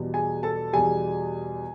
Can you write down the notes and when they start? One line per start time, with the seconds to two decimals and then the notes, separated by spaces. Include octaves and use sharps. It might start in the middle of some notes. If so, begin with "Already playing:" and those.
Already playing: E2 B2 G3
0.14 G#4 G#5
0.43 A4 A5
0.73 E2 B2 G3 G#4 G#5